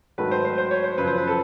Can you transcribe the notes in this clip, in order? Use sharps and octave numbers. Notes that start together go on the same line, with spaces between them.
G#2 D#3 F#3 A3 B4
C5
C5
C5
C#5
C5
F#2 C#3 F3 B4
C5
B4
A4